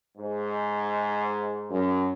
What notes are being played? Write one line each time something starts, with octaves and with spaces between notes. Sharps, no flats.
G#2
F#2